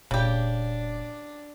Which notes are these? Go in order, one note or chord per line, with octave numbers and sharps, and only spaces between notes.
F1 A#2 C#3 D4 G4